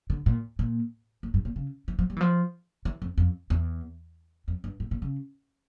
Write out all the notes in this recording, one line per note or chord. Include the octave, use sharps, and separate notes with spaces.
D3
A#2
A#2
A2
G2
A#2
C#3
E3
F3
G3
E3
F3
E3
F2
F2
E2
F2
G2
A2
A#2
C#3